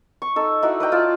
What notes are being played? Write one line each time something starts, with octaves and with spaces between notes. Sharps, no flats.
C#6
D#4 A4
D#4 E4 F#4 D5
B4 D5 G5 A#5
F4 D5 A5